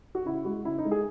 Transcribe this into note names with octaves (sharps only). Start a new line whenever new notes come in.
F#4
C#3 E4
G#3 F#4
C#3 E4
D#4
G#3
G#4